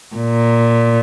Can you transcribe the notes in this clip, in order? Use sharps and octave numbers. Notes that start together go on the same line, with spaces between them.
A#2